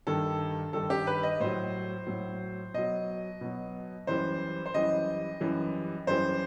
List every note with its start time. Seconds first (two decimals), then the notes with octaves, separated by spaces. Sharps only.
0.07 G2 D#3 G3 A4
0.73 G2 D#3 G3 A4
0.90 G4
1.07 B4
1.23 D#5
1.40 A2 F#3 C5
2.07 A2 F#3
2.74 B2 F#3 D#5
3.41 B2 F#3
4.07 F#2 E3 G3 C5
4.66 C5
4.74 F#2 E3 G3 D#5
5.41 F#2 E3 G3
6.07 F#2 E3 G3 C5